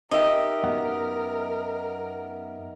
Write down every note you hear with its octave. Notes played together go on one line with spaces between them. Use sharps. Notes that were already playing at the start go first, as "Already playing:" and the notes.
D#4 G4 A#4 D#5 E5
F#2 B3 F#5